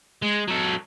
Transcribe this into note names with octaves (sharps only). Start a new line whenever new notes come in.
G#3
F#3 A4